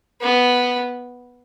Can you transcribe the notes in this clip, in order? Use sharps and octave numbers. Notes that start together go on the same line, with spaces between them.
B3